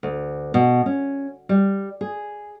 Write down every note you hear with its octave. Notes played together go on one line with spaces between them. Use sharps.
D2
B2
C#4
G3
G#4